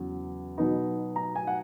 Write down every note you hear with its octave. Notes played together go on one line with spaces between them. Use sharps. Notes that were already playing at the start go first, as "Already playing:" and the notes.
Already playing: E2 C#3 F#3
B2 F#3 B3 D#4
A#5
G#5
F#5